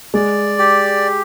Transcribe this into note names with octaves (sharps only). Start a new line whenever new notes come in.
G#3 D5
G4